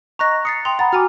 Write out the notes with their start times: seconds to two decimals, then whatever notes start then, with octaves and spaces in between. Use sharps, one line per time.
0.19 D#5 A#5 C#6 F#6 A#6
0.45 D#6 A6 C7 C#7
0.65 G5 C6 D#6 F7
0.79 F#5 A#5 B5 A6
0.93 F#4 G#5 A#5 D6 F6